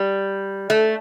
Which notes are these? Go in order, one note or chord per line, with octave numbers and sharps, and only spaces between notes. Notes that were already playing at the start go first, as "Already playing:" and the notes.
Already playing: G3
A3